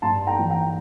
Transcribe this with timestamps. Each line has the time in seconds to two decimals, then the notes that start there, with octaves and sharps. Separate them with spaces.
0.02 G2 A5 C6
0.27 G5 A#5
0.39 E3
0.50 G5 A#5